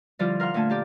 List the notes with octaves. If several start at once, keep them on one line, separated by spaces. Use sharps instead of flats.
D3 F3 G3 E4 F4 D5
A#4 F5 F#5 C6 F6
A#2 D3 A3 G#5 A5
A#3 G4 D5 D6